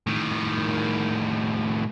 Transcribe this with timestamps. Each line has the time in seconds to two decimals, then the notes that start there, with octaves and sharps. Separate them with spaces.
0.07 A2 D#3